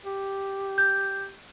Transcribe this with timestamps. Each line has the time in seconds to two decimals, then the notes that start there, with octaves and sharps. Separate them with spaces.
0.06 G4
0.78 G6